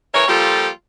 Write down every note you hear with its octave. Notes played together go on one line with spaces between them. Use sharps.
C#3 E3 A#4 C#5
F3 G3 A#3 F4 G4 A4